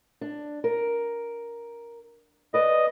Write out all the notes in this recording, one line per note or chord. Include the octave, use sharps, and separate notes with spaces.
D4
A#4
B4 D5 D#5